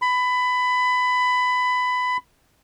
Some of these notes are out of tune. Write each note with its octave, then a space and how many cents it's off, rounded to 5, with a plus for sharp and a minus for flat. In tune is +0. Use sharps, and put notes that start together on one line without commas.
B5 +20